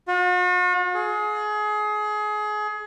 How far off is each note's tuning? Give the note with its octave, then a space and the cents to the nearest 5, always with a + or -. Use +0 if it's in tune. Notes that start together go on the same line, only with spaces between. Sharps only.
F#4 -45
G#4 +25